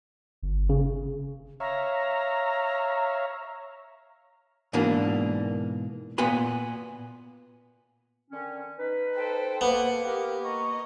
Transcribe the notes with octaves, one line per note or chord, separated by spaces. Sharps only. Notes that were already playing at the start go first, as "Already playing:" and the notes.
G1
C#3
C#5 E5 F5 A#5
G#2 B2 E3 A#3 D4
A#2 B3 B4 G#5 C6
D3 D#3 C#4
D#4 B4
A4 C5 G5
A#3 B3 F#5
G4 A#4
D#5 A#5 C#6